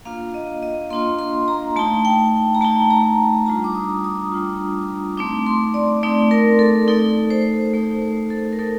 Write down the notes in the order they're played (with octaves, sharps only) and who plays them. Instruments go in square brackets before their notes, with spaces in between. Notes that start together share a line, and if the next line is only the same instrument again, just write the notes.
[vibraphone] A#3 D4 F4 F5
D#5
D#5
A#3 D4 F4 C6
C6
A#5
A3 D#4 A5
G5
A#5
A3 D#4 A5
A#5
G3 D4 F4 A#5
D6
D#6
D#6
G3 D4 F4
A3 C4 D#4 D6
C6
D5
A3 C4 D#4 D5
A#4
A4
A3 D#4 A4
C5
A3 D#4
C5
A4
A#4
A3 D#4 A4